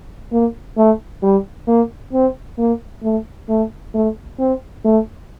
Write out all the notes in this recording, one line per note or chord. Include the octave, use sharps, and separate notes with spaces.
A#3
A3
G3
A#3
C4
A#3
A3
A3
A3
C4
A3